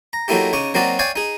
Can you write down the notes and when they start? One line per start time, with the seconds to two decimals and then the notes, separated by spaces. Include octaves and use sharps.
0.13 A#5
0.28 F#3 A3 A#3 D#4 E4 G4
0.53 C#3 D#4 C#6 D6
0.74 F#3 A#3 C4 D#4 F#4 D5
0.99 C#5 D5 F5 G5 G#5
1.16 D#4 G#4